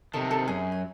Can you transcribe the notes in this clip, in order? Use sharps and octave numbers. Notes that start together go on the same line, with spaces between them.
C3 D#3 A4 A5
A4 A5
F#2 G#4 G#5
G#5